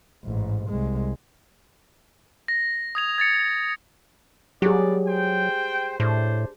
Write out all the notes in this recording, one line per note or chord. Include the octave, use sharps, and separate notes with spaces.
A1 G#2
C2 G#3
A#6
D#6 G#6 F7
G#6 A6 C#7
F#3 G3 B3 G4 G#4 D5
C5 G5
A2 D4 C5